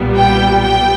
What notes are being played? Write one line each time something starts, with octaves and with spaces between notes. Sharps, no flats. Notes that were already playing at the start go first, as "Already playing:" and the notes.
Already playing: B1 A#2 G3 B3
G5
G5